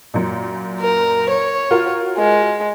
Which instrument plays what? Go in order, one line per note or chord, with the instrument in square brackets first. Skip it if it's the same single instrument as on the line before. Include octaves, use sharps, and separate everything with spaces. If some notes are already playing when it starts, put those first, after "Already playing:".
[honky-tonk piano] F#2 A#2
[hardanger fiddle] A#4
C#5
[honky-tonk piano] F4 F#4 A#4
[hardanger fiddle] G#3